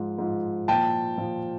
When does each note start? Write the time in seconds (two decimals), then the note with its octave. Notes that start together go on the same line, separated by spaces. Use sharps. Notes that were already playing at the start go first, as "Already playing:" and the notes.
Already playing: G#2 F3
0.18 G#2 F3
0.68 A#2 F3 G5 A5
1.18 A#2 F3